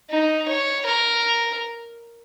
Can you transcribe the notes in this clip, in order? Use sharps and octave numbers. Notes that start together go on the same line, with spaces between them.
D#4
C#5
A#4